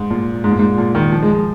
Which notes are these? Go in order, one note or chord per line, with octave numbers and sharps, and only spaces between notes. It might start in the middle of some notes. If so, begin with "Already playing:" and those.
Already playing: G#2
A#2
G#2
A#2
G#2
A#2
D#3
F3
G#3
F3